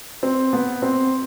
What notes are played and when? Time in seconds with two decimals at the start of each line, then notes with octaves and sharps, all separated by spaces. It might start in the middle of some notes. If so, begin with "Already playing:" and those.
0.23 C4
0.53 B3
0.82 C4